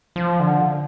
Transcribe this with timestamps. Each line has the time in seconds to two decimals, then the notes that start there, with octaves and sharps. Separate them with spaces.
0.16 F3
0.40 D3